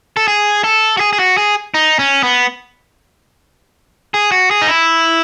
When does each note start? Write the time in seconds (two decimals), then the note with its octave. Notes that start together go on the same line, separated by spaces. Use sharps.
0.17 A4
0.28 G#4
0.64 A4
0.97 F#4
1.00 G#4
1.13 G#4
1.19 F#4
1.37 G#4
1.74 D#4
1.99 C#4
2.23 B3
4.14 G#4
4.32 F#4
4.51 G#4
4.62 D#4
4.69 E4